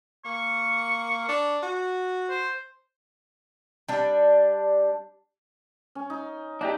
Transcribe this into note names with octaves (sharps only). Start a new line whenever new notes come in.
A#3 C#6
D4
F#4
C5
G3 D4
C#4
D#4
D4 D#4 G4 F#5